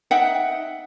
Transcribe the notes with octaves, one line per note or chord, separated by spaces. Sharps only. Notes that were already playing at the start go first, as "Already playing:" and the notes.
D#4 E5 F#5 G5